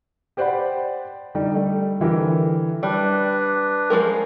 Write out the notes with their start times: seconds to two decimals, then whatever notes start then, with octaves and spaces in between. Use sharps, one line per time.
0.37 G4 C5 D5 F#5 G5 B5
1.35 D3 G3 D#4
1.55 G3 A3
2.00 D3 E3 G4 A#4
2.83 G3 D4 B4
3.90 F3 G#3 A#4